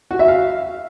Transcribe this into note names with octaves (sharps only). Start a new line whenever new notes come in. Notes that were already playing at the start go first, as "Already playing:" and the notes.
F#4
E5
F5